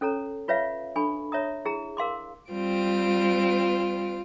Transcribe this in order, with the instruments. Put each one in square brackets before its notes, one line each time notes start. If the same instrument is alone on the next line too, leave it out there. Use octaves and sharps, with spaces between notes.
[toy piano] C#4 A4 C#5 A#5
F4 B4 C#5 E5 F5
D4 A4 G#5 B5 C#6
C#5 E5 A#5 D#6
E4 G#4 A#5
A#4 F5 C6 D6
[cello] G3 [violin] C4 D7 [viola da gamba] F4